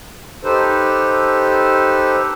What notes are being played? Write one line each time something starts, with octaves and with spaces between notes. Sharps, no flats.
D#4 G4 A4 B4 C5